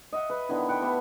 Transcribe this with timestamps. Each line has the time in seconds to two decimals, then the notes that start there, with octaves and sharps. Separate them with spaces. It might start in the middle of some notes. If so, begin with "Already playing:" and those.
0.13 D#5 E5 F#5
0.30 B4
0.49 D3 D#3 B3 E4
0.69 F#5 G5 B5 C#6
0.82 A3 B3 G4 E5